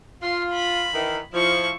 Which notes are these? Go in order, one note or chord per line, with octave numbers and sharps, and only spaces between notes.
F4 C6
B5
D#3 E3
F3 E4 C#6